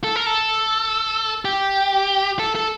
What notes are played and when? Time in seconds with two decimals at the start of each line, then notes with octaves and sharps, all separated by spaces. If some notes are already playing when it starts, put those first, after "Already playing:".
0.04 A4
0.16 A#4
0.26 A4
1.45 G4
2.39 A4
2.55 A4